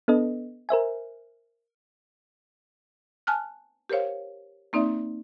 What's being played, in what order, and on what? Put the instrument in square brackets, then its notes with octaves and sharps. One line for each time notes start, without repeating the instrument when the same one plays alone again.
[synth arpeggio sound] B3 D4 A4 B4 D#5
A#4 C5 E5 G#5
[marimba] G#5 A5 F6 F#6
G4 A#4 C5 C#5 F5
A#3 C4 D#4 D5 E5